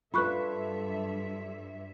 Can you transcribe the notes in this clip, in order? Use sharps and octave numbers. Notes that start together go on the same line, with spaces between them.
G2 F4 A4 B4 E5 B5 C#6 F#6